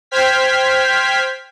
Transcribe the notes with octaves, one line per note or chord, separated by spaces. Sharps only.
C5 G5 F6 G#6 B6